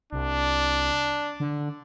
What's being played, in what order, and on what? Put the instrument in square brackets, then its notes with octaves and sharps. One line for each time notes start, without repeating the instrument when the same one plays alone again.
[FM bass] C2 [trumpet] D4
[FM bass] D3